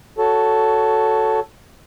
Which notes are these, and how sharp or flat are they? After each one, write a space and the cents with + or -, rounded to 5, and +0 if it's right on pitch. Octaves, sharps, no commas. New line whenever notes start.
F#4 +0 A4 +0 C#5 +15